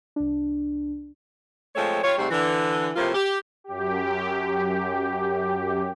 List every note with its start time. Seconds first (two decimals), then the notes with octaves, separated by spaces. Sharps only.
0.16 C2 D4
1.75 F3 G#3 A3 C4 C#5
2.03 G3 F4 C#5
2.17 G#2 C3 G3 A3
2.30 D3 E3
2.96 A2 C3 F3 A#3 F4
3.14 G4
3.64 F#2 G4